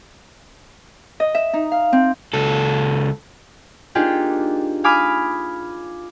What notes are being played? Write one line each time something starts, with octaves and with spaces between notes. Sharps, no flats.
D#5
E5
D#4
F5
C4
C#2 A4
A#3 D4 D#4 F4 G4 G#4
F5 G#5 B5 D6 D#6 F6